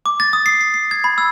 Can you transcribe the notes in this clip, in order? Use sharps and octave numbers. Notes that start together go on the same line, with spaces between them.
D6
A6
D#6
C7
C7
C7
G#6
B5
E6